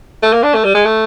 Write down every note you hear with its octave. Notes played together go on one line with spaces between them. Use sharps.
A3
A#3
D4
A3
G3
G#3
A3